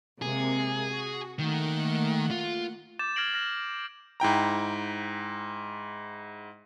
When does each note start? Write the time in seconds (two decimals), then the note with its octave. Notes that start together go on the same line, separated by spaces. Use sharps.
0.22 C3 G#3 A#3 G#4
0.91 F#4
1.39 D#3 A3 A#3 F#5
2.31 F4
2.99 D6 G6 A6 E7
3.16 F6 G#6 A#6 C7 D7 F#7
3.34 F6 A#6
4.20 G#2 E4 G5 A#5